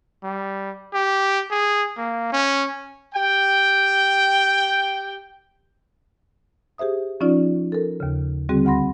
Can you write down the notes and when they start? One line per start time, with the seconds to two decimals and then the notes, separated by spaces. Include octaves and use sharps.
0.23 G3
0.94 G4
1.51 G#4
1.97 A#3
2.32 C#4
3.15 G4 G5
6.78 G4 G#4 C5 E5 D#6
7.20 F3 C#4 D#4 F4 D5
7.72 A4 A#4
8.00 D#2 C#3
8.49 D3 G3 C4 F#4 G#4
8.65 D2 F#5 B5 C6 A#6